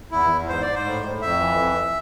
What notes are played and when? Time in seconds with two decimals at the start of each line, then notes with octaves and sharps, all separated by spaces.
0.12 E2 E4
0.30 E2
0.48 G#2 C5
0.61 D5
0.67 G#2
0.75 C5
0.85 A2
1.03 A2
1.22 F2 E5
1.40 E3
1.58 F2